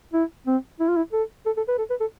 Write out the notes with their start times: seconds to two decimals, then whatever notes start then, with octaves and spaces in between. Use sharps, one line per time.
0.13 E4
0.47 C4
0.80 E4
0.88 F4
0.96 E4
1.13 A4
1.46 A4
1.57 A4
1.68 B4
1.78 A4
1.90 B4
2.00 A4